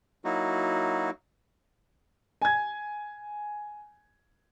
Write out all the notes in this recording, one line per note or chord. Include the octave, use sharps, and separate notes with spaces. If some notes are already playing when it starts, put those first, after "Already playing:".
F#3 A#3 D#4 E4 F#4
G#5 G#6